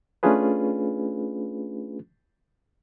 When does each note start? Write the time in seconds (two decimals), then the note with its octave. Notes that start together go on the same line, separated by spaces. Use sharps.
0.23 A3 C#4 D4 F4 G#4 B4